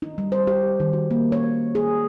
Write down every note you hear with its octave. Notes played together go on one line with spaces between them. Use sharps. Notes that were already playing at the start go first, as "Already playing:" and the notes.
D#4
G3
C5
G4
D#3
F#4
A#3
C#5
G#4